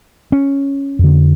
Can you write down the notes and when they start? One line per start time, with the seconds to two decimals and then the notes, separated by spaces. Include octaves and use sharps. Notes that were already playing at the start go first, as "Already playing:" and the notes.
0.32 C#4
0.99 F2 D3